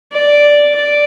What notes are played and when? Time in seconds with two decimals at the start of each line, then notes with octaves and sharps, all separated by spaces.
0.13 D5
0.76 D5